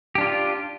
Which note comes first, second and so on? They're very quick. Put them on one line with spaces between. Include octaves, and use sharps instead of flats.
G4 D4 F4